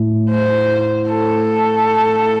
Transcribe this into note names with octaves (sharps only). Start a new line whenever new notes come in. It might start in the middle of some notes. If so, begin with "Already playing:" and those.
Already playing: A2 A3 E4
C5
A4